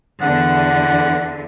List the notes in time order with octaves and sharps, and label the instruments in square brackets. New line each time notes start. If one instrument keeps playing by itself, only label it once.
[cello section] E2 D3 [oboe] F#5